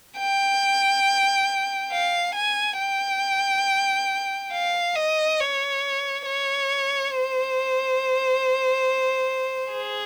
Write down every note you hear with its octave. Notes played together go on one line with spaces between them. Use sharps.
G5
F5
G#5
G5
F5
D#5
C#5
C#5
C5
G#4